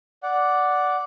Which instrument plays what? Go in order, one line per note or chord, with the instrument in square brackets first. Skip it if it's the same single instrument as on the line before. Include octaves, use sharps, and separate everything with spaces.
[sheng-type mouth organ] D5 F#5